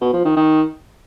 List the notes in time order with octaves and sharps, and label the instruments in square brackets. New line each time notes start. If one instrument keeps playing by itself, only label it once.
[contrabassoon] B2
F3
D#3
D#3